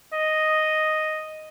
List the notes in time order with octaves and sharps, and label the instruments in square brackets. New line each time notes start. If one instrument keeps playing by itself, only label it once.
[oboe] D#5